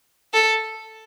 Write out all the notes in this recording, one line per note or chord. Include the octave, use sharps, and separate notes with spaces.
A4